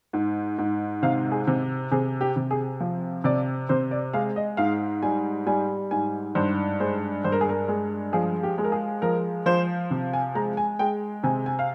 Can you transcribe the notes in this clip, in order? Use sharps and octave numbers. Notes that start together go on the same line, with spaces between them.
G#2
G#2
C3 F5
G#4
C3
C3 G#4
G4
C3
G#4
F3
C3 D5
C3 C5
D5
G#3 F5
D#5
G#2 F5
G3 G#5
G3 G#5
G#2 G#5
G2 C5
G#3 C5
G2 C5
A#4
G#4
A#4
G#3
F3 G#4
G4
G#3
A#4
G#4
F3 A#4
F3 C5
C3
G#5
G#3 A#5
G#5
G#3 G5
C3 G#5
G#5
F5